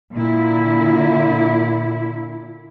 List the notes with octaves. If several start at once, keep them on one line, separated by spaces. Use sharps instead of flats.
A#2 D3 E4